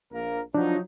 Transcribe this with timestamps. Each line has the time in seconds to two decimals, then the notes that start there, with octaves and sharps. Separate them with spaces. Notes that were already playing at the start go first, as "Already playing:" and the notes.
0.12 A#1 A#3 A#4
0.54 F3 F#3 D4 D#4